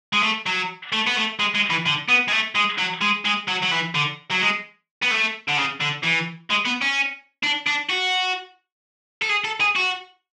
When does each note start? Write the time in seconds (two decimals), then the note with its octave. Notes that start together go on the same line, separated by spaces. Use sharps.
0.13 G#3
0.23 A3
0.46 F#3
0.92 A3
1.07 B3
1.16 A3
1.39 G#3
1.55 G#3
1.70 E3
1.86 D3
2.09 B3
2.28 G#3
2.32 A3
2.55 G#3
2.78 F#3
3.02 G#3
3.25 G#3
3.48 F#3
3.63 F#3
3.72 E3
3.95 D3
4.31 F#3
4.42 G#3
5.02 B3
5.11 A3
5.48 D3
5.57 C#3
5.81 D3
6.04 E3
6.50 G#3
6.65 B3
6.81 C#4
7.44 D4
7.67 D4
7.89 F#4
9.22 A4
9.29 G#4
9.44 A4
9.60 G#4
9.76 F#4